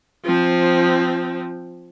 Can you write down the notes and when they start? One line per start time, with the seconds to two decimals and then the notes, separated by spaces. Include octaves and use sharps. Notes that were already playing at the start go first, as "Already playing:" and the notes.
0.25 F3 C4